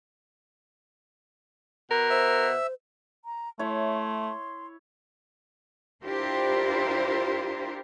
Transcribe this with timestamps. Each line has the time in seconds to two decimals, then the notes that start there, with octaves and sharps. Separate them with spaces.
1.91 B2 A#4
2.10 C5 E5
3.25 A#5
3.59 A3 E4 C#5 C6
6.03 D4 E4 F4 G4 A#4 C5